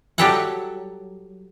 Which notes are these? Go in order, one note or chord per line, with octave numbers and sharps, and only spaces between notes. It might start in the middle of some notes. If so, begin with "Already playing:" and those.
F#3 G3 G4 A4 C#5 F#5